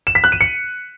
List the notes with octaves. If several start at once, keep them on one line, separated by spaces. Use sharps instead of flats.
E7
B6
F#6
D#7
C#7